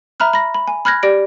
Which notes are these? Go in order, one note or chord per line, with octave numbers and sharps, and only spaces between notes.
E5 A#5 B5 F6 F#6
B5 A#6
B5
G#5
B5 F6 F#6 G#6 A#6
G4 D5 A#6 D7